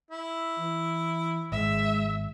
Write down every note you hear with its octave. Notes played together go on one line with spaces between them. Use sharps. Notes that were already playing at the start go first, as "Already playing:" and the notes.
E4
E3
G#1 G#3 E5